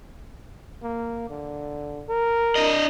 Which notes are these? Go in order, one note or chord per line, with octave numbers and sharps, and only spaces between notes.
A#3
D3
A#4
D4 D#5